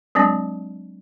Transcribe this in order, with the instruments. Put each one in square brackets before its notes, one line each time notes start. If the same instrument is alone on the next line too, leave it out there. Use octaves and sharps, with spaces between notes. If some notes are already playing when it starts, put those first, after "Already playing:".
[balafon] F#3 G#3 C4 D4